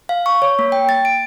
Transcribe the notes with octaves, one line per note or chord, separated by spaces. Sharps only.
F5
C#6
C#5
A#3
G5
A6
D7